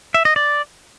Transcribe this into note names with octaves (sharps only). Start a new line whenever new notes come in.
E5
D#5
D5